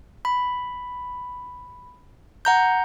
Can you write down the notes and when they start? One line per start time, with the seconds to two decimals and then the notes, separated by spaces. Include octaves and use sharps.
0.25 B5
2.45 F#5 A#5 G6